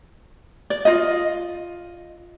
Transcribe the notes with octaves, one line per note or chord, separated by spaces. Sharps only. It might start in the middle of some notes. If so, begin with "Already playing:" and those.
D5
F4 D#5